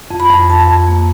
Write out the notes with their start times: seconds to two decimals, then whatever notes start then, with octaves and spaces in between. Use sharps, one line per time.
0.11 F2
0.20 B5
0.30 F2
0.49 F2 A5
0.69 F2
0.88 A#3